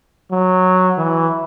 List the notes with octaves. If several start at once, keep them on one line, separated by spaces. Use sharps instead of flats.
F#3
E3